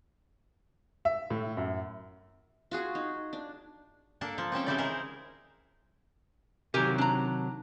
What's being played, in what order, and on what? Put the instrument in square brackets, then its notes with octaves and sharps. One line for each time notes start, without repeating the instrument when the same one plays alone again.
[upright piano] E5
A2
F#2
[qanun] F4 F#4 G#4
D#4
D4
[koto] A#3 D4 A4
F3
C4 C#4 A4 G5
C#3 E3 G3 C4 E4 D5
D#4 E4 G#4 A#4 C5
[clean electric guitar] C3 D#3 F#3 [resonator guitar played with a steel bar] G4 A#4 G#5
[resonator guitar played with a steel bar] D4 A#5